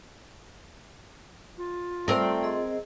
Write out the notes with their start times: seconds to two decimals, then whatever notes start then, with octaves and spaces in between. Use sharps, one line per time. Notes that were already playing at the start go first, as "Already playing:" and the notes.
1.58 F4
2.08 A3 C4 A#4 D5 G5
2.43 G#4 D#5